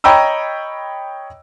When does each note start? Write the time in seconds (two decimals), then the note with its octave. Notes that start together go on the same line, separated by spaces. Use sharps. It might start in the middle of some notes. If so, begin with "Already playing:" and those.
0.04 C#5 D#5 G5 A#5 B5 E6